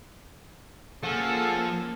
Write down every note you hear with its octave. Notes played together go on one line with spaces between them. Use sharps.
F3 A#3 C#4 F#4 G#4 A4